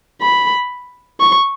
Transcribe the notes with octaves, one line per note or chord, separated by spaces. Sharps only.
B5
C#6